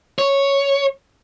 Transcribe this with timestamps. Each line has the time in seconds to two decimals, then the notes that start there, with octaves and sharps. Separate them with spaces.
0.19 C#5